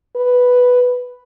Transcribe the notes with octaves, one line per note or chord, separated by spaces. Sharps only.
B4